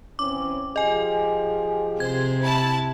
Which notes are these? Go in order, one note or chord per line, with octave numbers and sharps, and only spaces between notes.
E3 C4 C#4 D6
F3 G4 G#4 D#5 G#5
C3 C5 G#6
E4 A5